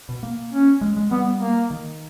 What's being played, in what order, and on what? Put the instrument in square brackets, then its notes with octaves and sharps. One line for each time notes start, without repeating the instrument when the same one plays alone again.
[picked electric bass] B2
A#3
[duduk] C#4
[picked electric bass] G#3
G#3
[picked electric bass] G3 [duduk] B3
[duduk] A#3
[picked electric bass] D#3